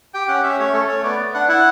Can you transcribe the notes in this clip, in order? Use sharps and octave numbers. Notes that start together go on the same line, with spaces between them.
G4 G5
C#4 F#5
C#4 E5
A3 C#5
A3 A4
A3 C#5
B3 D5
B3
D4 F#5
E4 F#5